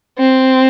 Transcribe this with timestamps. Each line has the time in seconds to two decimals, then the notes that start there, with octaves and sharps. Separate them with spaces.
0.19 C4